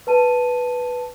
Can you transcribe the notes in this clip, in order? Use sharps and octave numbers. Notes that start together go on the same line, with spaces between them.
B4 A5 D#7